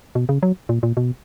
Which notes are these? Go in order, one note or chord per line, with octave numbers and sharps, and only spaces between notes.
B2
C#3
F#3
A#2
A#2
B2